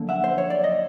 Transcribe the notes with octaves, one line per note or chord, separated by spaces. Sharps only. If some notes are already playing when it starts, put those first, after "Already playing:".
Already playing: F#2 D3 F3 A#3
E5 F#5
C5
C#5
D5
D#5